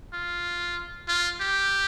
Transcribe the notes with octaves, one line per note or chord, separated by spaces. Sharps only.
F4
F4
G4